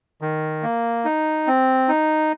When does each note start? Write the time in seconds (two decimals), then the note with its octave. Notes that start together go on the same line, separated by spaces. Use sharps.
0.21 D#3
0.63 A#3
1.05 D#4
1.47 C4
1.88 D#4